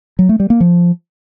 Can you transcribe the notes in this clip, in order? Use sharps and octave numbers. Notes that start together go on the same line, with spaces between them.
F#3
A3
G3
A#3
F3